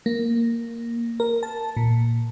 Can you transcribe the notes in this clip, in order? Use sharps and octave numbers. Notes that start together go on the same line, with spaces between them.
A#3
A#4
A5
A#2